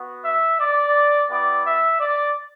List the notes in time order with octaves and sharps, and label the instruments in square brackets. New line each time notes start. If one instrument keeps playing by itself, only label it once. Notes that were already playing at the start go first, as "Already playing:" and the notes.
Already playing: [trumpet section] B3 F#4
E5
D5
B3 E4 G4 D5
E5
D5